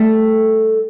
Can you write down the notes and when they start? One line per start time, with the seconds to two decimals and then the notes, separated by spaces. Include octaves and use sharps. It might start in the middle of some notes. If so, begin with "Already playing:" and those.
Already playing: G3 A3